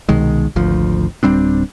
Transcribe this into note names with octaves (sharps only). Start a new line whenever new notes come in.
C2 B2 D#3 G#3
G#1 D2 F3
D1 G3 C4 D4